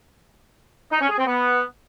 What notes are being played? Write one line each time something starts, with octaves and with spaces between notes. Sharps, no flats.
D#4
C#4
G#4
C4
B3